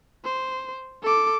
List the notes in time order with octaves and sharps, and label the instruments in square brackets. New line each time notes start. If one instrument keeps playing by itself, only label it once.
[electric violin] C5
A4 D6